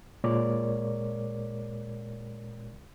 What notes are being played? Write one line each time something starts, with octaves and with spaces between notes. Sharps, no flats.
A#2 G#3 A#4 C#5 D5 D6